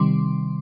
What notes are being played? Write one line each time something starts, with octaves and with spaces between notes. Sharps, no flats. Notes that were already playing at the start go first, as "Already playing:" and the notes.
Already playing: C3 D#3 G3 C6 D6